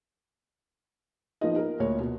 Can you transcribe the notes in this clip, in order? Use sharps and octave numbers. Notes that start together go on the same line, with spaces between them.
F3 B3 D#4 A#4 D#5
A#4
D2 A#2 C#5
B2